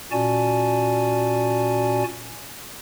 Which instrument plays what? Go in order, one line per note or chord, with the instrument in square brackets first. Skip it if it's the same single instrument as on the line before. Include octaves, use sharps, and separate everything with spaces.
[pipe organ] A#2 C#4 F#4 D5 G#5 A5